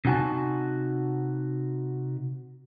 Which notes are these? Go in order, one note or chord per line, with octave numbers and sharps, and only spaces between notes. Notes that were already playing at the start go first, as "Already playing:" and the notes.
C3 D#4 F#4 G#5 A5